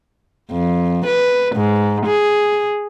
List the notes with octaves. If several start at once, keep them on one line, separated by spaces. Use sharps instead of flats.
F2
B4
G#2
G#4